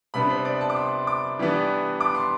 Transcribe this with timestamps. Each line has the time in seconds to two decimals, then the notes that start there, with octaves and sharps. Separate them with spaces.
0.14 C3 G3 B3 D4 B5
0.30 C5
0.45 D5
0.61 A5
0.70 D6
0.76 C6
1.07 D6
1.39 E3 G3 B3 D4
2.01 D6
2.15 C6